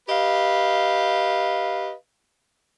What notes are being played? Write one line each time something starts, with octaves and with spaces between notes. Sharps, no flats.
G4 B4 D#5 F5